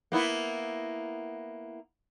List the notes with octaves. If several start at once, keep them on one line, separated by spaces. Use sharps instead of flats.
A#3 B3 E4